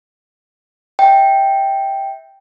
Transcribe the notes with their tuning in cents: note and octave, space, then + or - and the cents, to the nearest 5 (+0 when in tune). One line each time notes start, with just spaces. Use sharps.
E5 -20 G5 +0